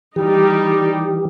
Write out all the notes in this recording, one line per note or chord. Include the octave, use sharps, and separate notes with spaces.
E3 G3 D#4 G4